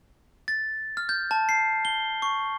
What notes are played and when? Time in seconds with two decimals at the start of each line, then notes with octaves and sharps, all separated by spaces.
0.48 A6
0.97 F6
1.09 G6
1.31 A5
1.49 C7
1.85 G7
2.22 C#6